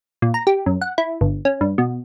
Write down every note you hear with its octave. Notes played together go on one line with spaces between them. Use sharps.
A#2
A#5
G4
F#2
F#5
E4
G1
C#4
G2
B2